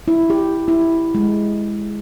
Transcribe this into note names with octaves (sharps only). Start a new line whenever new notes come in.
E4
G4
E4
G#3